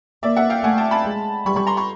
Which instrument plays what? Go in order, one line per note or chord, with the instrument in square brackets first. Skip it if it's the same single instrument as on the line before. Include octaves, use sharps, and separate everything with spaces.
[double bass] A#3 [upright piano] D5 E5
[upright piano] E5 F#5
F5 G5
[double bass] A3 [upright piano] F#5 G#5
[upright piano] G5 A5
A5 B5
[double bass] G#3
[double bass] G3 [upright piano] B5 C#6
[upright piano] B5 C#6
A#5 C6
B5 C#6